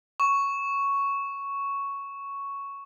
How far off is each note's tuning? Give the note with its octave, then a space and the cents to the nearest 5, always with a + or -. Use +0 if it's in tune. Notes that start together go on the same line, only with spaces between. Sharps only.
C#6 +5